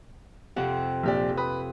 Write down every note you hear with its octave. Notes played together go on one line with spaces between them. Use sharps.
F2 C3 F#5
A#1 G4 D5
B4 D#6